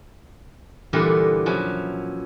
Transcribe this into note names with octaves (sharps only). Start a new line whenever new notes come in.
A#2 D3 E3 G3 B3 A#4
F3 F#3 C#4 E4